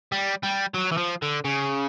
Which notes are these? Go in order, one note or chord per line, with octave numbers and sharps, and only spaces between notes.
G3
G3
F#3
E3
F3
D3
C#3